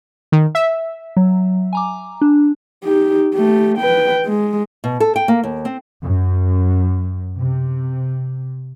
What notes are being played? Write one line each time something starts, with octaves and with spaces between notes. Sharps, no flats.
D#3
E5
F#3
G#5 A#5 D6
D4
D#4 G4
A3 G4
B4 G5
G#3
B2
A4
G5
A#3
D#2
C4
F#2
C3